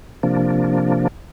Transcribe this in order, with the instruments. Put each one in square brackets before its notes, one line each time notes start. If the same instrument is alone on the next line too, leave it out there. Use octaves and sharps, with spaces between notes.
[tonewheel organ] C3 F3 A#3 D4